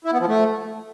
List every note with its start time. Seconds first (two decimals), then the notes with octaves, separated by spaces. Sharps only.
0.05 E4
0.12 B3
0.20 F3
0.28 A3